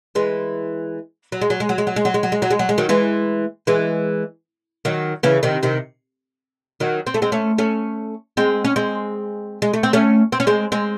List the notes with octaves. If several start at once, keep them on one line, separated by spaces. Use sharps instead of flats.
E3 G#3
F#3
G#3
F#3
G#3
F#3
G#3
F#3
G#3
F#3
G#3
F#3
G#3
F#3
G#3
F#3
G#3
D#3 F#3
E3 G#3
E3 G#3
D#3 F#3
C#3 E3
C3 D#3
C3 D#3
D#3 F#3
C4
A3
G#3 C4
A3 C#4
A3 C#4
G#3 C4
C#4
G#3 C4
G#3
A3
C4
A3 C#4
C4
C#4
G#3 C4
G#3 C4